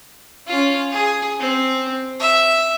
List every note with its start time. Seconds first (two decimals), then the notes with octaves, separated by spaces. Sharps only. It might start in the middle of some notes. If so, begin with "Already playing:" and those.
0.47 C#4 F4
0.91 G#4
1.40 C4
2.20 E5